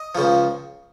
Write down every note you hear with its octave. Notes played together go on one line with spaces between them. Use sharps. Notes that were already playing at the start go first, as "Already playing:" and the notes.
Already playing: D#5
C#2 C#3 F3